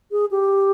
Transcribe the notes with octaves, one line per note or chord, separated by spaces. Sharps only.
G#4
G4